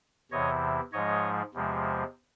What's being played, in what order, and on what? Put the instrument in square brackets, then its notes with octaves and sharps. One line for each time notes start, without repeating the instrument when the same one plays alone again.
[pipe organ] E2 C3 E3 C#5 D#5
G#2 F3 G#3 C#5 D#5
E2 C3 F3 G#3